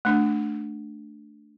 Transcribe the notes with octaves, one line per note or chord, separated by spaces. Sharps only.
A3 D4